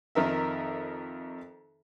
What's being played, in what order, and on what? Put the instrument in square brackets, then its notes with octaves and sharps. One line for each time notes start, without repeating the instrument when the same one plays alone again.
[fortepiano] F2 D#3 A#4 E5